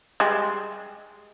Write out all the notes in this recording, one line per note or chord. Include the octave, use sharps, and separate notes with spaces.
G3 G#3